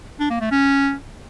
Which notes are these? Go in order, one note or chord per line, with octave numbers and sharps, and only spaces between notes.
D4
A#3
A3
C#4